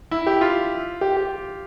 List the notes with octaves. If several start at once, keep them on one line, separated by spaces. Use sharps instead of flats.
E4
G4
F4
G4
G4